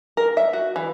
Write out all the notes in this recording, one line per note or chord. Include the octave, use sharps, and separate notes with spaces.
A#4
E5
F#4
E3